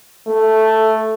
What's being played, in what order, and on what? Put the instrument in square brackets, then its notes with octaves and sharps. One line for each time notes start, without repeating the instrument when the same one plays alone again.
[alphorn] A3